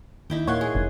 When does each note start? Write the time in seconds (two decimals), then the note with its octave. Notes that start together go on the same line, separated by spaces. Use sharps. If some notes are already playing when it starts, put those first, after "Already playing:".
0.30 D#2 D#4 E4 G5
0.47 A#2 A#3 C#5 F#5 C6 G#6
0.61 G#4
0.75 F1